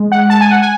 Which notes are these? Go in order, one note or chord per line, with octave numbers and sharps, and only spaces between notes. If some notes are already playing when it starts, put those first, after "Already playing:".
Already playing: G#3
F#5
A5
G#5
F#5
G#5